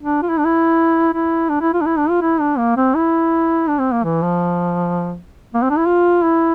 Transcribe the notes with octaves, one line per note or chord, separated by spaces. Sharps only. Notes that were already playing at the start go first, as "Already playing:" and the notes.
D4
F4
E4
D4
E4
E4
D4
E4
F4
D4
E4
D4
F4
E4
D4
A#3
C4
E4
D4
C4
A#3
E3
F3
A#3
C4
D4
E4
F4
E4